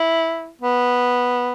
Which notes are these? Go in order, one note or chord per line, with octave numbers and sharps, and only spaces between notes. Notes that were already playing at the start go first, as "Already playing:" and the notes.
Already playing: E4
B3